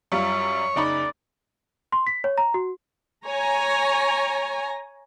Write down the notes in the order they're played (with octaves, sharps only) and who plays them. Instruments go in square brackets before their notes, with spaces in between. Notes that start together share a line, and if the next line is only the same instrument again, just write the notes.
[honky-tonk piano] F#2 G3 F4 [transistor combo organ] C#5
[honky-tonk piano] F#1 D#4 B5 [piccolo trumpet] D5
[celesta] C6
B6
C#5
A#5
F#4
[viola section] C#5 G#5 A#5